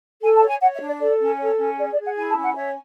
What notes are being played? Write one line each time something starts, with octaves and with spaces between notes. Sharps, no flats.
A4 G#5
A5
C#5
G#5
C#5 F#5
E5
D4
D5
A4 D5
C#4
A4 C#5
C#4
G#4 D5
D5
G#4
F#5
E4 G#5
A5
C#4
F#5
C#5 E5